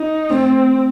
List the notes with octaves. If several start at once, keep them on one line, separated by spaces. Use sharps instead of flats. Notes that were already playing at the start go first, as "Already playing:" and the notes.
Already playing: D#4
A3 C4